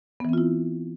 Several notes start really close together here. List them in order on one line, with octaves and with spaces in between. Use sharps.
B3 E3 C4 F4 E4